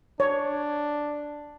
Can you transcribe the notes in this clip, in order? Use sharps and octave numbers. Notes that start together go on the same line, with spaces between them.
D4 C#5